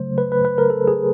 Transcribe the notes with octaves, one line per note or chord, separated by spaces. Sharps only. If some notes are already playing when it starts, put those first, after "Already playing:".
Already playing: C#3 F#3 A3 C5
B4
B4
B4
A#4
A4
G#4